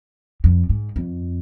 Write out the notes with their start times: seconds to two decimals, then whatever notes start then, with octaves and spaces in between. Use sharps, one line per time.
0.44 F2
0.69 G#2
0.96 F2